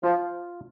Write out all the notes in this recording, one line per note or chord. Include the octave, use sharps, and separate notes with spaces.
F3 F4